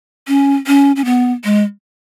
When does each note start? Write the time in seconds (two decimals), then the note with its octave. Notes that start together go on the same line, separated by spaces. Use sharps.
0.28 C#4
0.67 C#4
0.96 C#4
1.05 B3
1.44 G#3